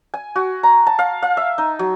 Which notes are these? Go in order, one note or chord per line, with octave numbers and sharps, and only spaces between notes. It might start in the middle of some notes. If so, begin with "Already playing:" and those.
G#5
F#4
A#5
A5
F5
F5
E5
D#4
F#3